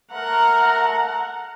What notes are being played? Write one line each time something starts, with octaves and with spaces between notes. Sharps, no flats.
A3 A#4 F#5 A#5